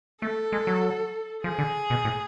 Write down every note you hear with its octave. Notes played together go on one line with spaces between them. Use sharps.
A3 A4
G#3
F#3
F3 G#4
D3
B2
A2